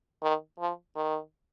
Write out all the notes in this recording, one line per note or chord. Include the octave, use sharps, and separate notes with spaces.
D#3
F3
D#3